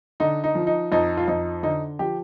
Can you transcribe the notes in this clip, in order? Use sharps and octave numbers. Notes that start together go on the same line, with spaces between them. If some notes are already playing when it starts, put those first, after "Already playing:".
D3 D#4
D#4
F3
D#4
F2 D#4
F4
F2 D#4
D3 D#4
F3 G4